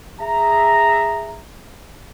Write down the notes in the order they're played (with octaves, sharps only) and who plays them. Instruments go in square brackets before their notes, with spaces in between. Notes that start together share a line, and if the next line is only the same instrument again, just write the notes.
[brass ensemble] G#4 E5 A#5